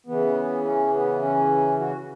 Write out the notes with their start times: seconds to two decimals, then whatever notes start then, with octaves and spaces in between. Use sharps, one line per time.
0.07 C#3 E3 B3
0.65 C#4
0.93 B3
1.22 C#4
1.80 F#4